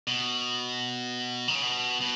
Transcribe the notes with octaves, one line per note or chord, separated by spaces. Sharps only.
B2
D#3
C#3
B2
B2